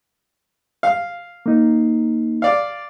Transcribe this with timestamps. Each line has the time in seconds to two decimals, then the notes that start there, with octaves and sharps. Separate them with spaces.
0.83 F5
1.46 A#3 D#4
2.42 D5 F5